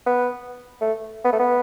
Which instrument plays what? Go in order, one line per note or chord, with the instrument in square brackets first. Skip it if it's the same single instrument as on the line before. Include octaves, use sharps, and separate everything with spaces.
[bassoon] B3
A3
B3
A3
B3